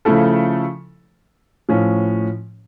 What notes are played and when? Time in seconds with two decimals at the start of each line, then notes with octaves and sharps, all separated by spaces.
0.05 C#3 F3 A3 E4 A4
1.69 A2 F3 C#4